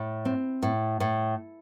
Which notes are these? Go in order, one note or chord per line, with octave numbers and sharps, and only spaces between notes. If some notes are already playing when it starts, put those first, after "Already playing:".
Already playing: A2
C4
A2
A2